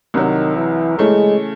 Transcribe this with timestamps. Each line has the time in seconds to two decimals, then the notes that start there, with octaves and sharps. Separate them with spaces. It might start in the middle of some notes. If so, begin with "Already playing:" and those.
0.14 C2 C3 D#3 F#3
0.56 E3
0.98 C#3 E3 G#3 A3 C#4